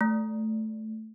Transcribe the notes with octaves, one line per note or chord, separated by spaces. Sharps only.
A3